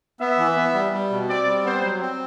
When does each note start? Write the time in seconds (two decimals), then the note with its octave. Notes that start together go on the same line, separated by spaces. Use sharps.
0.20 B3 E5
0.38 E3
0.56 B3
0.74 G3
0.93 G3
1.10 B2
1.29 C4 D5
1.47 G3
1.64 B3 C5
1.83 F#3
2.01 C4